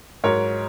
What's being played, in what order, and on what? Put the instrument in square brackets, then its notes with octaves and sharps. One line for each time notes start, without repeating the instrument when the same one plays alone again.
[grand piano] G#2 F#3 A#4 C#5